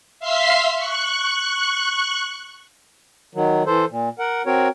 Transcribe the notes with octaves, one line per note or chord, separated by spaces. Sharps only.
E5 F5 C6 B6 C7
C#6 F#6
D#3 F#3
E3 A4 C5
A#2
A#4 F#5
C4 F#4 A#4 C#5